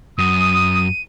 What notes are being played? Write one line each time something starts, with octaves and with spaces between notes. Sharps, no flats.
F#2 D#6 D#7